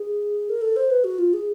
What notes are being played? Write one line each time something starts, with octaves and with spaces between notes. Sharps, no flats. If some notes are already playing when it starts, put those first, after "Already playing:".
Already playing: G#4
A#4
A4
C5
B4
F#4
F4
G#4